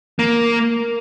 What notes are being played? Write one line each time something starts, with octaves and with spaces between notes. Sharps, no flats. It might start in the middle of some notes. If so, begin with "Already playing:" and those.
A#3